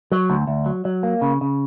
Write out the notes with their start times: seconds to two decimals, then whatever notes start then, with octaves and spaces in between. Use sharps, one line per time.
0.12 F#3
0.30 D2
0.47 D2
0.66 F#3
0.85 F#3
1.03 A#3
1.22 C#3
1.41 C#3